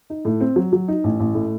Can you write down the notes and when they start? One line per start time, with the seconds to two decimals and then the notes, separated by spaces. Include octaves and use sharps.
0.10 D#4
0.25 A2
0.41 C4
0.56 F#3
0.73 F#3
0.88 D#4
1.04 A1
1.20 A1
1.34 A2